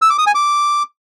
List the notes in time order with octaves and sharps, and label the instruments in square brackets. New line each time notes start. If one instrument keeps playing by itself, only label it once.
[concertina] E6
D6
D#6
G#5
D6